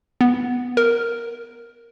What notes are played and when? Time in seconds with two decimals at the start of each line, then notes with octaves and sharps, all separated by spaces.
0.21 B3
0.77 A#4